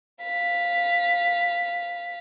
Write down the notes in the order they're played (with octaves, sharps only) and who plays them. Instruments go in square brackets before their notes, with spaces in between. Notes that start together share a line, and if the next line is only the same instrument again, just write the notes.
[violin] F5 B6